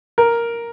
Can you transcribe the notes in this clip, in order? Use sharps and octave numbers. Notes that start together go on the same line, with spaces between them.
A#4